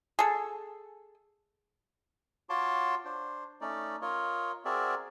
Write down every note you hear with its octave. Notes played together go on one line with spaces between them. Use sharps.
G#4 A4
F4 F#4 C#5 A5 C6 D6
D4 C5
A3 C#4 D#4 D5
F4 A#4 C#5 D#5
C4 F#4 G#4 A#4 D5 E5